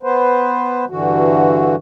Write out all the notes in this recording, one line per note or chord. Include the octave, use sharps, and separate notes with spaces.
B3 B4 C5
G2 D3 E3 F#4